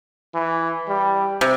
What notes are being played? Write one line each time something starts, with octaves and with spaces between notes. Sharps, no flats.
E3
G3
C3